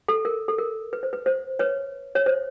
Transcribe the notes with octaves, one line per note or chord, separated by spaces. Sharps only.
A4
A#4
A4
A#4
B4
C5
B4
C5
B4 C#5
C#5
C5